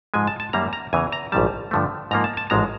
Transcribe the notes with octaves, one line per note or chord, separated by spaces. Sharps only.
G#2 F3 G#3 G#5
A5
A5
F#2 D#3 G3 A#3 A#5
A#5
E2 C#3 E3 G#5
A#5
A#1 G#2 D#3 G3 A5
G2 D3 F3 A3
G#2 F3 A#3 A#5
A5
A5
A1 G#2 F3 G#3 A#5